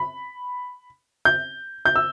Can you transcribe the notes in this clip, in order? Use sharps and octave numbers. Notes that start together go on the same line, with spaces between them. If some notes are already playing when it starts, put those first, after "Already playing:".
Already playing: B5
G6
G6
E6